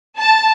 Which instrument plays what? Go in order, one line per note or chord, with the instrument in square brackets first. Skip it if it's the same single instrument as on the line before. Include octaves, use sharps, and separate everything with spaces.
[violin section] A5